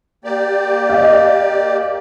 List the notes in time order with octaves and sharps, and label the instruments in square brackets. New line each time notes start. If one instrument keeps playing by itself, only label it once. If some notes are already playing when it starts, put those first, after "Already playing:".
[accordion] A#3 G4 D5
[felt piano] D#5 F5